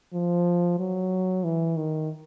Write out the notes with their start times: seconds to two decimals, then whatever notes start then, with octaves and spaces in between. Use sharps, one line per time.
0.14 F3
0.79 F#3
1.44 E3
1.77 D#3